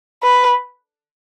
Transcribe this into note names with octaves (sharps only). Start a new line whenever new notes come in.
B4